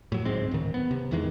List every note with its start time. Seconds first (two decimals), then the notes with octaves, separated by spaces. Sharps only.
0.12 A2 F#3
0.25 D1 G#2 G#3 C4
0.51 D1 D#3
0.74 B3
0.91 C3
1.11 E2 D#3 E3 G#3